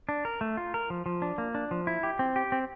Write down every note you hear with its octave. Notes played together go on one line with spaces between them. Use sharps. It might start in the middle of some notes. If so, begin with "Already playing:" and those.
D4
A#4
A3
F4
A#4
F3
F3
D4
A#3
D4
F3
E4
G4
C4
G4
C4